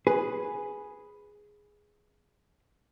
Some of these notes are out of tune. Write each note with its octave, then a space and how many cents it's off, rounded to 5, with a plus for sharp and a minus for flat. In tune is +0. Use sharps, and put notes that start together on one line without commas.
G#4 +0 B4 +0